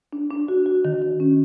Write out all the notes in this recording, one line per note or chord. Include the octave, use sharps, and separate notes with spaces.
D4
D4
F#4
F#4
D#3
D#3
C#4